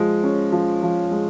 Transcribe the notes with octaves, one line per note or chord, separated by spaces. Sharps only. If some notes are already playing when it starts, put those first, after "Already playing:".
Already playing: F3 G#3
C#4
F3
F3
G#3